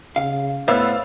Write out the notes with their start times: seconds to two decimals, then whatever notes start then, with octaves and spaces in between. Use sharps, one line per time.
0.16 C#3 F5
0.68 A2 B3 C5 C#5 E5 F5 E6 A6